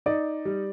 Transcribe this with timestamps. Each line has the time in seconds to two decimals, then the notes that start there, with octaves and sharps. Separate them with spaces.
0.06 D#4 D5
0.45 G3